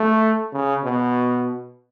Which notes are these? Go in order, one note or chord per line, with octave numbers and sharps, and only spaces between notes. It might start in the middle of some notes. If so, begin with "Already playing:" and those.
Already playing: A3
C#3
B2